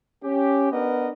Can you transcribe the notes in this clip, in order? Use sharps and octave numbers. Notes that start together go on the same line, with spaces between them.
C#4 G4
B3 D4 A#4 B4 D#5